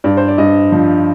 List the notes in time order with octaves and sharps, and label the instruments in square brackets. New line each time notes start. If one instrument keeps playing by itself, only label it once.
[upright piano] G2 D5
C5
D5
G2 D#5
F3